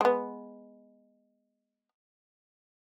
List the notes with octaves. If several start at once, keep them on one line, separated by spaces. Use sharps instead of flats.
G#3 B3